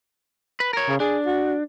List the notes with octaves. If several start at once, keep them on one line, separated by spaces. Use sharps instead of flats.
B4
A#4 C#5
C#3
D4 G#4
F#4